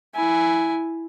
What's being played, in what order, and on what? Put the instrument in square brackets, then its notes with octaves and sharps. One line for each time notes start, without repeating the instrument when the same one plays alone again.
[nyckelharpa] E4 G#5